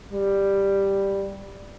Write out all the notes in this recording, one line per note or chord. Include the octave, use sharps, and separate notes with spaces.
G3